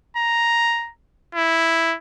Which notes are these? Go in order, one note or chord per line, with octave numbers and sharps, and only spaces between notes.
A#5
E4